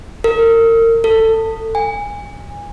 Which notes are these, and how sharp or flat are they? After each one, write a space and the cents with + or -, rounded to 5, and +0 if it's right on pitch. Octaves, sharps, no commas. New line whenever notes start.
A#4 -35
A4 +20
G#5 -25